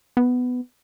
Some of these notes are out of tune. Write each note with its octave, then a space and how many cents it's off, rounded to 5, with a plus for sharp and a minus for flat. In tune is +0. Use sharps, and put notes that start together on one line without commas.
B3 +10